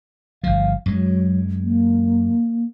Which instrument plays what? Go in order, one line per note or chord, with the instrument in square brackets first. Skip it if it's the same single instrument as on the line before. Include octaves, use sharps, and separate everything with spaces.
[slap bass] G1 F3 [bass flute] F5
[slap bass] F#2 G#3 [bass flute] F#3
[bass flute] A#3